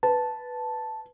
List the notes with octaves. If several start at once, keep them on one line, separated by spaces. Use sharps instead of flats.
B4 A5